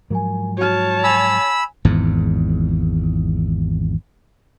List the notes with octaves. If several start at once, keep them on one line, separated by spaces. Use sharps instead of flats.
G#2 F3 F#3 A#4 G#5
F#4 C#5 A5 F6
G#5 B5 E6 G#6 F7
G#1 E2 G#2